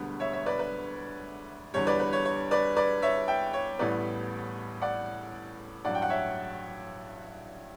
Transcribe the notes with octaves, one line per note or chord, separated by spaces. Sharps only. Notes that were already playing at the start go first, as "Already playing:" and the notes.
Already playing: E1 D2 D3 G3 B3 B4
C#5 E5
C#5 E5
B4 D5
B4
E2 D3 G3 C#5
B4 D5
B4
C#5
C#5
B4 D5
B4 D5
C#5 E5
E5 G5
C#5
A1 A2 G3 B3 B4 D5
D5 F#5
A1 G2 F#3 D5 F#5
G5
F#5
C#5 E5